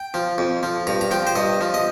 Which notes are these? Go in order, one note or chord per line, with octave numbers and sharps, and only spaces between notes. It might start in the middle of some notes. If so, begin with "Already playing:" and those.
Already playing: G5
F3
F2
F3
G2 A#5
A#5
F3 G5
C5
G2 D#5
F3
D#5